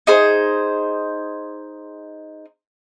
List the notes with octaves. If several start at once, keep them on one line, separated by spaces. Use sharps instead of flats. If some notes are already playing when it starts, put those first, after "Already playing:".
D#4 G#4 C5